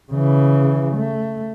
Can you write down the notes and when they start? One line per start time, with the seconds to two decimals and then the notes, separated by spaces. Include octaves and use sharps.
0.12 C#3 E3
0.96 A3